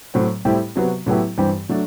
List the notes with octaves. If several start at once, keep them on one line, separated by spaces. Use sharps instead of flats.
A2 F#3 C4
A2 G3 C4 E4 G4
C3 F#3 B3 F#4
A2 F#3 B3 E4 G4
G2 E3 G3 C4 G4
F#3 A3 D4